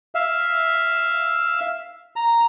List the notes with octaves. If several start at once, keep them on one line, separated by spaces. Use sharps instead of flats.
E5 F5
A#5